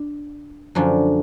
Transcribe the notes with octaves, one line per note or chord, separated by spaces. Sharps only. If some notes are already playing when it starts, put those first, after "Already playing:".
Already playing: D4
F#2 D3 F3